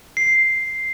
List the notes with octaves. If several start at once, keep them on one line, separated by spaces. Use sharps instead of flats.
C7